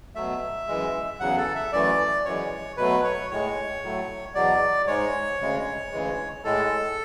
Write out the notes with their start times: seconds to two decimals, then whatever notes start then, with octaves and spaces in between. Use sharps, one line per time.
0.15 B2 F#3 A3 E5
0.68 F#2 E3 G#3
1.20 E2 C#3 F#3 F#5
1.37 A4
1.55 E5
1.72 F#2 E3 A3 D5
2.25 F#2 E3 G#3 C#5
2.77 B2 F#3 A3 B4
3.04 C#5
3.30 A2 G#3 C#5
3.82 A2 F#3 A3
4.35 E2 B2 F#3 D5
4.87 G#2 G#3 C#5
5.40 D2 C#3 G#3
5.92 D2 C#3 E3 G#3
6.44 A2 G#3 A4